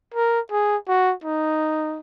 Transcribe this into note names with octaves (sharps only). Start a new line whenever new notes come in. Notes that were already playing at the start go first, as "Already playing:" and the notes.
A#4
G#4
F#4
D#4